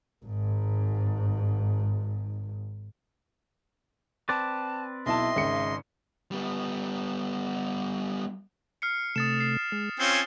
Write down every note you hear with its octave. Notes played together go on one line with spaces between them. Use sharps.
G#1 G#2
C4 B4 D5 A5
B1 E4 D#5 E5 A5 C6
G#1 C#3 C#7
G3 B3
F6 C7 C#7
C3 A3 D#6 A6 E7
C7
G#3
C4 C#4 F4 G#5 G#6 C7 G7